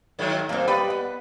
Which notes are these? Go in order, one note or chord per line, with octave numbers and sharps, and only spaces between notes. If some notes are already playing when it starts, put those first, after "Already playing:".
G#2 D#3 F#3
F#2 A#3 C4
G3 B4 D5 D#5
B3